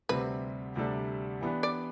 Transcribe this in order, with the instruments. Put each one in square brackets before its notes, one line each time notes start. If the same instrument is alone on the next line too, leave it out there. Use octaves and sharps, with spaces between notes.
[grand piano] D2 C3 G3 C4 [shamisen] B4
[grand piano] D2 C3 G3 D4 A4
E3 B3 D4 G4
[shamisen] D5